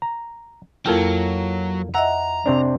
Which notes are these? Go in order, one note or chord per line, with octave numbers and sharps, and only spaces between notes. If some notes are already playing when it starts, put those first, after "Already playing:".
A#5
F2 F#3 A#3 E4 F4 A4 G5
D#5 E5 F#5 A#5 E6
C3 C4 D4